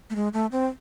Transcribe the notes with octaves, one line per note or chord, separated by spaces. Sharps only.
A3
G#3
A3
C4